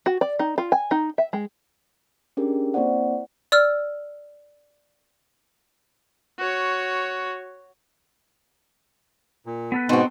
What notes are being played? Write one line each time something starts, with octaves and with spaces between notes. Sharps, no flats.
F#4
D5
D#4
F4
G#5
D#4
E5
G#3
C#4 D4 G4 G#4 A#4
A#3 C4 E4 C5 D5 F#5
D5 E6 F6
F#4 C#5
A#2
B3 A4 B4
G#2 B2 C4 D#4 F#4